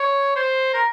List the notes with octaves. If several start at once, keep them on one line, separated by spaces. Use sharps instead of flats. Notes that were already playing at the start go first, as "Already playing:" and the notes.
Already playing: C#5
C5
A#4